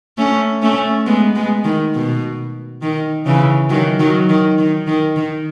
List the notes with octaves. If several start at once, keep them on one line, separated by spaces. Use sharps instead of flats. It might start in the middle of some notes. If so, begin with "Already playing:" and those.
A3 C#4
A3 C#4
G#3 B3
G#3 B3
D#3
B2
D#3
C#3 E3
D#3 F#3
D#3 F#3
D#3
D#3
D#3
D#3